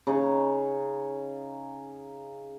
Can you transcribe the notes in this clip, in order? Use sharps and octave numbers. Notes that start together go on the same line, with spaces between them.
C#3 D#4 C#5 C#6